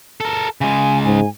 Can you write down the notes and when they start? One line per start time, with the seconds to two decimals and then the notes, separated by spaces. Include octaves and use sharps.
0.20 A4 A#4
0.61 C#3 G#3 G#5
1.05 G#2 G#5